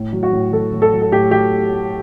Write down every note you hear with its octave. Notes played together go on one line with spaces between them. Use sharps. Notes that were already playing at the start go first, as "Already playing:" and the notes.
Already playing: A2
F#3
F#4
A2
F#3 A4
A2
A4
F#3
A4
A2 G4
F#3 G4